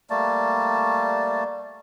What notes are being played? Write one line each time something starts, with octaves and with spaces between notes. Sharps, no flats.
G3 A3 A#3 A5